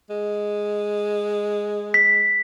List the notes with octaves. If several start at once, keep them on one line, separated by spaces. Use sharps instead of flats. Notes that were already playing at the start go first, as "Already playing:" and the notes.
G#3
B6